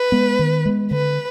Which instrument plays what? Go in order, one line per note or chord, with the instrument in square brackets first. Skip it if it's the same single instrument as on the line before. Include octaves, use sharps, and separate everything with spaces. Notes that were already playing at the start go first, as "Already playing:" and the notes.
Already playing: [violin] B4
[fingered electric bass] G#3 B3
D#3
G#3 B3
[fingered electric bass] D3 [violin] B4